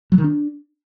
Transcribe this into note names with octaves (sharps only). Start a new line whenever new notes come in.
F#3
D#3
D4